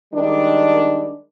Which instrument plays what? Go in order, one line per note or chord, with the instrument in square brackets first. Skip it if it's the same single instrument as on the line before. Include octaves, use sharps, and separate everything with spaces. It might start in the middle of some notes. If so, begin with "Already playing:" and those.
[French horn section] D#3 G3 G#3 D4